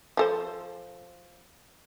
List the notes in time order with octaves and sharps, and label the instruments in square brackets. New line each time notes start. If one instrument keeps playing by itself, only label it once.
[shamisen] F3 A4 C5